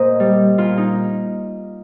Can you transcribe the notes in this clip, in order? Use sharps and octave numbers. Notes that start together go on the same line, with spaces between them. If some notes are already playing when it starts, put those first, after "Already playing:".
Already playing: A#2 A#4 C5 D#5
G3
A#2 F4
D#4